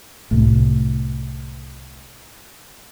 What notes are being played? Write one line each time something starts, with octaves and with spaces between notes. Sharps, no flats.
C2 A2